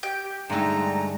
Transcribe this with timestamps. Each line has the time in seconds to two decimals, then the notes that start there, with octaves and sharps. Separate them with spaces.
0.03 G4 G5
0.50 G2 D3 G#3 A3 D#4 A#5